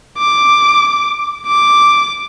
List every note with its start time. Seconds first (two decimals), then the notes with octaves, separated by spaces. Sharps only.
0.19 D6
1.47 D6